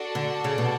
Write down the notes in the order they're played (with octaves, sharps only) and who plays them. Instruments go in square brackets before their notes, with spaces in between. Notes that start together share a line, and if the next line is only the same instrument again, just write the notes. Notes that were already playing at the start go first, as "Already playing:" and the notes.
Already playing: [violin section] D4 F#4 A4 D5 A5
[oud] D3
C#3
B2